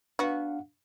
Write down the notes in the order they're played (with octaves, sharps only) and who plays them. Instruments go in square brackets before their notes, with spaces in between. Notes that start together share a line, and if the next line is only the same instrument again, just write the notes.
[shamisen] B3 F#4 [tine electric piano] D4 F5